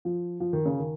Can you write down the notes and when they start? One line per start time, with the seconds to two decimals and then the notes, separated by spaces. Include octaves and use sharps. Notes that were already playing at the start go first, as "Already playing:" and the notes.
0.05 F3
0.40 F3
0.53 D#3
0.66 C#3
0.79 D#3